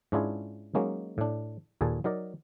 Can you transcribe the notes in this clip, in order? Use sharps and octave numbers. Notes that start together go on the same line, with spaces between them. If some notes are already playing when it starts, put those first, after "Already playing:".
G#2 C#4 D4 E4 F4 G#4
F#3 G#3 A#3 C#4 D#4
A2 D4
D#2 A#2 G#4 A4 A5
F#3 D#4 A#4 D5